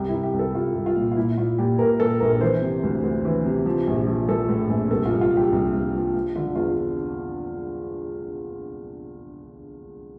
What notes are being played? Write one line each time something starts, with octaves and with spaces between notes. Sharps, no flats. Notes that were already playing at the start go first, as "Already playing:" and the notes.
Already playing: C2 G4
E4
C2
G4
C2
A4
C2 F4
C2
F4
A#2
F4
A#2 E4
A#2 F4
A#2 G4
A#2 A#4
A#2 A4
A#1 A#4
E3 C5
C3
D2
D2
E3
C3
F3
A#1
F3
F3 A4
A2
A#1
C2 A4
F4
C2
F4
F3 G4
C2
C2
F3
F3
D3 F4
E2 F4